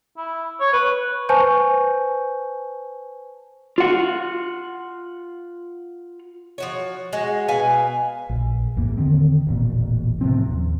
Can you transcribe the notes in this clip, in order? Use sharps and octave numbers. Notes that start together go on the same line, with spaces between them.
E4
C#5
B4
B4 C5 G#5 A5 C#6 G6
F4 F#5
F3 F#4 C#5
G#3 F#4
B2 B4 F5 G#5
A#1
A#1 E2 A2 A#3
D3 D#3 C4
E1 A1 A#2
A2 C3 F3 C4
D#2